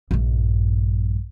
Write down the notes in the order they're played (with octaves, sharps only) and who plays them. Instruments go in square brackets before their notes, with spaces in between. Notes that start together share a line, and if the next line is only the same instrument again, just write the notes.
[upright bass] A#1 G2